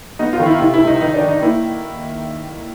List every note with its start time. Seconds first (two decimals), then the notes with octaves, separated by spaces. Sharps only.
0.19 B3 D#4
0.33 F4
0.39 D#3
0.46 E4
0.59 C3 E4
0.74 E4
0.80 C#2
0.87 D#4
1.01 D#3 D#4
1.14 D4
1.21 D#3
1.28 D#4
1.42 A#3 E4